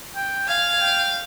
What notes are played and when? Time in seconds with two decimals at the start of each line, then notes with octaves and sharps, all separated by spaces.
0.16 G5
0.48 F5 G#5
0.81 G5